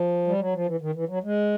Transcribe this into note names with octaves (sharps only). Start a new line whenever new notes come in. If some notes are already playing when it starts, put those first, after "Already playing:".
Already playing: F3
G3
F#3
F3
E3
D#3
E3
F#3
G#3